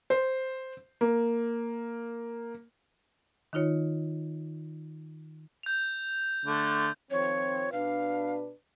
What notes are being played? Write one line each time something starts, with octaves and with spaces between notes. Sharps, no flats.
C5
A#3
D#3 D#4 F4 C#5
G6 F7
D3 A3
D#3 F3 C4 C#5
B2 D4 B4 F5